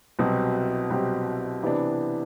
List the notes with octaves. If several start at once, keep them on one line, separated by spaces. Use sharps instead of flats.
C2 B2 F#3 C4 G4
C2 B2 F#3 C4 G4
C3 E3 B3 D4